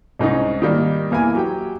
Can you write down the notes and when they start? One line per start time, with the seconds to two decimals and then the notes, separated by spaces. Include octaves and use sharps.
0.19 C2 G#2 C#4 D#4
0.62 D#3 G3 A#3
1.11 E2 E3 A#3 E4 G#5
1.35 F#3 G4 G5